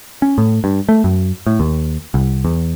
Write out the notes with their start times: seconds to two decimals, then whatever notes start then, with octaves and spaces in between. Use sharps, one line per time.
0.22 C#4
0.38 A2
0.64 G2
0.89 A3
1.04 F#2
1.46 A2
1.60 D#2
2.14 C2
2.45 E2